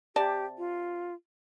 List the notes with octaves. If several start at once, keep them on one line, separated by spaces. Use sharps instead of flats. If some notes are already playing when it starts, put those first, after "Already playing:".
C3 G4 D5 A5
F4